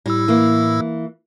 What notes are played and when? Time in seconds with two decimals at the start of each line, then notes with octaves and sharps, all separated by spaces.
0.06 A2 G3 E4 E6
0.28 E3 A#3